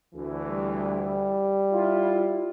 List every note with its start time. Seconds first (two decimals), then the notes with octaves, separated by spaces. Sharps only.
0.14 D2 E3
0.48 G3
1.72 E4 F4